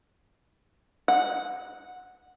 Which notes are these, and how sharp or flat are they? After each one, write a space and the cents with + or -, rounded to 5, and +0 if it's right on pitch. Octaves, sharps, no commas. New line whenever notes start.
F#5 -10